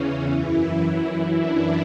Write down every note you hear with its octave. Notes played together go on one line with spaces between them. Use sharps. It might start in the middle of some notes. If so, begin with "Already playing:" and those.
Already playing: E2 C#3 E3 C#4
F#2 E3 E4
F#2 E3
D4